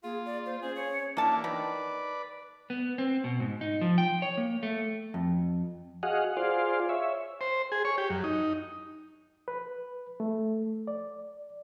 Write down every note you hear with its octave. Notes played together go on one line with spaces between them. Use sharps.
A#3 F4 G#4
D5
C5
C#4 G#4 C5
C#5
E3 F#3 A#3 D4 A5
D#3 B4 D5
B3
C4
B2
G#2
D#4
F3
G5
C#5
A#3
A3
F2
F#4 G#4 D#5 F5 F#5
F4 G#4 C5 D5 F5
C#5 E5
C5
G#4
C#5
G4
F#2
D#4
B4
A3
D5